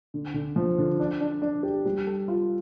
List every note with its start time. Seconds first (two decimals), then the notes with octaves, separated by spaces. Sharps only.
0.14 D3
0.34 D3
0.56 F3
0.78 D3
1.00 D4
1.21 D4
1.42 D4
1.63 G4
1.85 G3
2.07 A4
2.28 F4